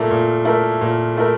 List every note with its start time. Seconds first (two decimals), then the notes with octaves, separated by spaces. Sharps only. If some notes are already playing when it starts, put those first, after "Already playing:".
Already playing: A#2 A3 E4 A#4
0.10 A#2
0.45 A3 E4 A#4
0.81 A#2
1.17 A3 E4 A#4